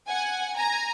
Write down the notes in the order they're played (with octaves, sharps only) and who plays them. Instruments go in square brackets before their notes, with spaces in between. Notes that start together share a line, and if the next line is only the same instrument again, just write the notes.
[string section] F#5 G#5
G#5 A#5